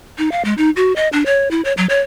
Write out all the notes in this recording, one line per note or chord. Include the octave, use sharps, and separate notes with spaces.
D#4
F5
G#3
D#4
F#4
D#5
D4
C#5
E4
C#5
F#3
C#5